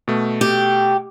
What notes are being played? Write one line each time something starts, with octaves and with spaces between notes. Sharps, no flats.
B2 A3
G4